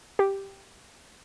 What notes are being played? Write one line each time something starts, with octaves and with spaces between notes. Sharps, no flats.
G4